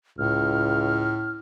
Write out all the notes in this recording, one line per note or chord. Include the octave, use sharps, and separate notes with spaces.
C#2 A2 F6